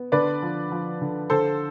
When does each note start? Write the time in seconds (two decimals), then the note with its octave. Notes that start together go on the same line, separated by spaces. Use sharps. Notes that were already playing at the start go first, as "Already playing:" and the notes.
Already playing: B3
0.12 D3 B4 D5
0.43 F3
0.72 F3
1.01 D3
1.30 D3 A4 C5